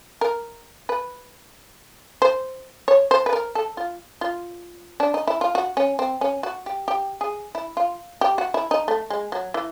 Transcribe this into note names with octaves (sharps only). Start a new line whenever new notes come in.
A#4
B4
C5
C#5
C5
B4
A#4
A4
F4
F4
D4
D#4
E4
F4
F#4
C#4
C4
C#4
F#4
G4
G4
G#4
E4
F4
G4
F#4
E4
D#4
A3
G#3
F#3
E3